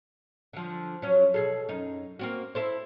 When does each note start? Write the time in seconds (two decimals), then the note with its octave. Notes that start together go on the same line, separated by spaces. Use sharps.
0.53 D3 F3
1.02 F#3 C#4
1.34 B2 G#4 A4
1.69 F#2 D#4
2.19 A#3 C4 F#4
2.55 E4 A4 C5